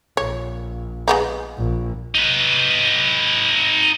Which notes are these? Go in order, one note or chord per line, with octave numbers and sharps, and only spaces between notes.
A#1 C#5
G#3 B3 D#4
A#1
D#4 B4